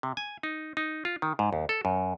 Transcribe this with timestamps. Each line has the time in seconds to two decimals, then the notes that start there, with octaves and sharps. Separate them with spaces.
0.03 C3
0.17 G#5
0.43 D#4
0.77 D#4
1.05 F4
1.22 D#3
1.39 G#2
1.53 D#2
1.69 A4
1.85 F#2